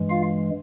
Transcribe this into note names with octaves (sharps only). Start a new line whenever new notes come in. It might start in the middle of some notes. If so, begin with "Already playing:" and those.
Already playing: G2 E3 G#3
F4 F5